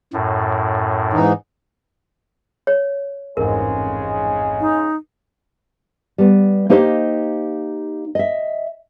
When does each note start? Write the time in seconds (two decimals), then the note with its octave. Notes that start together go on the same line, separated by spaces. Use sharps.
0.13 F#2 A2
1.13 G#2 E3 D#4
2.67 C#5
3.37 A1 F2 G#2 C#3 G#3 A#4
4.60 D#4
6.18 G3 B3
6.69 A#3 D#4 G4 C5 D#5 F5
8.15 D#5 E5